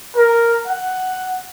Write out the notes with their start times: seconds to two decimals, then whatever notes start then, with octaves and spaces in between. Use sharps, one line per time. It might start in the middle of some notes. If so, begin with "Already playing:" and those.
0.16 A#4
0.67 F#5